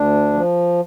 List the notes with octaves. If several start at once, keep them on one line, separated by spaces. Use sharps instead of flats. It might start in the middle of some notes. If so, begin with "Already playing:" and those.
Already playing: D2 D4
F3